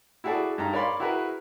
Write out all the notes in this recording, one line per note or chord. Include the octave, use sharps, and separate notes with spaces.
E4 F#4 G#4 A4 D5
G2 D#4 A#5
A#4 C#5 D5 F5 B5 C6
E4 F#4 G#4 A#4 B4